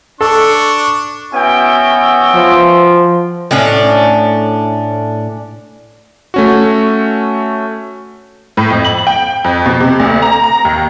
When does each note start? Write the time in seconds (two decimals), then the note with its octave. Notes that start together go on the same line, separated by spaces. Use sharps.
0.21 D4 A4 C#6
1.33 B3 C#4 E4 F#4 G5
2.35 F3
3.51 A2 C#4 D4
6.34 A3 C#4 F#4
8.57 A2
8.70 F2
8.85 F#7
9.07 G5
9.44 F2
9.66 B2
9.80 C3
10.00 D2
10.22 A#5
10.44 A#5
10.65 D#2